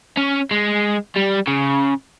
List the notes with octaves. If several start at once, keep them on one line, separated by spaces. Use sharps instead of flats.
C#4
G#3
G3
C#3